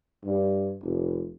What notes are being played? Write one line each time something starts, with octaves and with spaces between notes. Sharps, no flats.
G2
F1